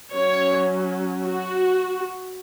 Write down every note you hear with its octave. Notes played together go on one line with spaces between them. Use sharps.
F#3 C#4 C#5
F#4